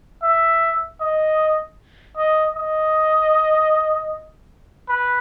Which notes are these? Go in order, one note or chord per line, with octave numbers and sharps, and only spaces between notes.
E5
D#5
D#5
D#5
B4